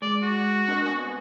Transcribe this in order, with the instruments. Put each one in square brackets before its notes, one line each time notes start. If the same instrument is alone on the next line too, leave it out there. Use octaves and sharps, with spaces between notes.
[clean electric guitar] G#3 [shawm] D5
[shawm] F#4
[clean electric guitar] D4 A#4 D#5
C2 B3 G#5